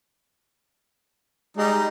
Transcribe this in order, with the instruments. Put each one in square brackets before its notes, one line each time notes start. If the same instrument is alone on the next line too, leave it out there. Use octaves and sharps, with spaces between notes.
[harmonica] G3 D#4 [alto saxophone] G#3